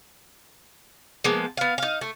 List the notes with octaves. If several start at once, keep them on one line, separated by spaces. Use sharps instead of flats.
F3 G#3 A#3 B3
B3 F5
D#4 F5
A3